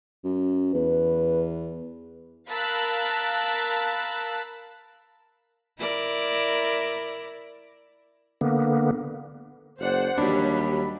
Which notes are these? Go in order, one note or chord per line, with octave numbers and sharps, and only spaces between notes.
F#2
E2 B4
A#4 F5 A5 B5 E6 F#6
E4 A#4 D5
D3 A#3 B3
F#1 C5 D5 F#5
D#2 F#3 G3 D4 B5